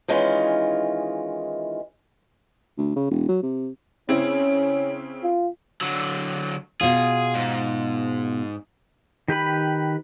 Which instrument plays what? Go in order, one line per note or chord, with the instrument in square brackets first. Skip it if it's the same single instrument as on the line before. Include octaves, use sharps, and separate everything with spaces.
[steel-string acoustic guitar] D#3 E3 G#3 C#4 F4
[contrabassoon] D2
C#3
E1
F#3
C3
[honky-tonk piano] C#3 C4 E4 [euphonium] C#4
[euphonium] F4
[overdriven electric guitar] D3 F#3
[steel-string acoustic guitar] B2 F4 [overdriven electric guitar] G#4
[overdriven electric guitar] G#2
[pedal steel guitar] D#3 G4 B4 B5